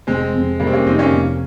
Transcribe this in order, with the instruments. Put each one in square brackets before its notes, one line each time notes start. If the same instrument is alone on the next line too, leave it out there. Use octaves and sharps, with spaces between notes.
[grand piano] F1 [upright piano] G#3 C4
[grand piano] F2 C3
[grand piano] F1 [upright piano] G3 A#3
[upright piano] C4
A#3 C#4
[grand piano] F2 C3 [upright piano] C4 D#4
[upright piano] A#3 C#4
[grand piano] F1